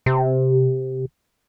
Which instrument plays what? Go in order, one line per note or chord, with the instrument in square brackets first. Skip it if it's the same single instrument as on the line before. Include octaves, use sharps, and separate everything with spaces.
[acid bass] C3